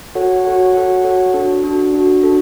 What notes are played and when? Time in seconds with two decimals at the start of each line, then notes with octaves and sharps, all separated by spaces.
0.15 F#4 A4 C#5 F#5
0.45 F#4 A4 C#5 F#5
0.74 F#4 A4 C#5 F#5
1.04 F#4 A4 C#5 F#5
1.34 D4 F#4 A4
1.64 D4 F#4 A4
1.93 D4 F#4 A4
2.23 D4 F#4 A4